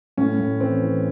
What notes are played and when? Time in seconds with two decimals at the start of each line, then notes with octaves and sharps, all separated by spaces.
0.17 A2 C#4
0.39 A2
0.60 E3 C4
0.82 E3